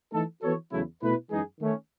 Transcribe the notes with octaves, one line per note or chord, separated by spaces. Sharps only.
E3 A3 D#4 A4
E3 B3 F#4 A4 C#5
E2 C#3 F#3 A3 E4
B2 A3 E4 B4
F#2 E3 G#3 D#4 G#4
D#3 A3 C#4